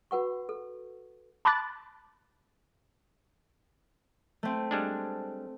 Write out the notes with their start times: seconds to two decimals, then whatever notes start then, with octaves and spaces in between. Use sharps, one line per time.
0.11 F#4 B4 F#5 C#6
0.49 A4
1.45 A5 B5 D6 F#6 A6
4.43 A3 C4
4.71 G3 G#3 D4